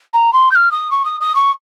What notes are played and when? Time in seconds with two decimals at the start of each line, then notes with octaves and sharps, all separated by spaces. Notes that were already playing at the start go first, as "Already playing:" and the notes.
0.13 A#5
0.33 C6
0.51 G6
0.55 F6
0.72 D#6
0.91 C#6
1.05 D#6
1.21 D#6
1.35 C#6